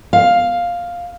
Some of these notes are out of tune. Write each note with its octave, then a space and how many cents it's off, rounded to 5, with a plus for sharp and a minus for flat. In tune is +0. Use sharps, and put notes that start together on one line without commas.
F5 +5